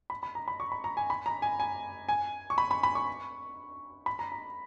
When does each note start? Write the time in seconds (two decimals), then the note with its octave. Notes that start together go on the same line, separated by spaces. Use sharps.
0.10 B5
0.23 B5
0.35 A#5
0.48 B5
0.60 C#6
0.72 B5
0.84 A#5
0.97 G#5
1.10 B5
1.26 A#5
1.42 G#5
1.60 G#5
2.09 G#5
2.50 C#6
2.58 B5
2.71 B5
2.83 B5
2.95 C#6
4.06 B5
4.19 A#5
4.32 A#5